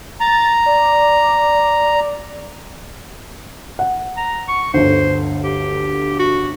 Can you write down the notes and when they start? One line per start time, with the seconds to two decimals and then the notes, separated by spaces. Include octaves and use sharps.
0.20 A#5 A6
0.66 D5
3.79 F#5
4.17 A#5
4.48 C#6
4.74 G1 D2 C5
5.44 G4
6.19 F#4